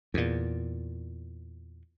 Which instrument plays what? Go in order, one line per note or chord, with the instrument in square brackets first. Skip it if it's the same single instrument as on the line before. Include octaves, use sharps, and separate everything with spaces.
[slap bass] E2 A#2